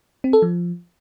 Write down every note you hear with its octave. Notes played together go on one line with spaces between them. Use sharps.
C4
A4
F3